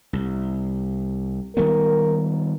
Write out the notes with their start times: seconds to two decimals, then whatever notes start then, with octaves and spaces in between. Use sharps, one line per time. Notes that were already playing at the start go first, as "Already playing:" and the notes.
0.13 C2
1.57 D#3 G3 B3 A#4